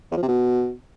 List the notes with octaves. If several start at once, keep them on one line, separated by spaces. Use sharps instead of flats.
E2
F3
C3
B2